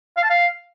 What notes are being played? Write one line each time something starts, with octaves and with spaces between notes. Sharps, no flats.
F5
A5
F5